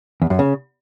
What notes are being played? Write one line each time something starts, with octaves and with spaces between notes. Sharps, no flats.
E2
F#2
C#3